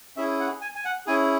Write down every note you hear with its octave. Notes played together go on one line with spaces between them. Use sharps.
C#4 E4 G#4 E5
F#5
G#5
G#5
F#5
C#4 E4 G#4 G#5